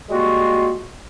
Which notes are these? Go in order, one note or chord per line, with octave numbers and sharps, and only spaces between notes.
G3 G#3 A#3 F4 F#4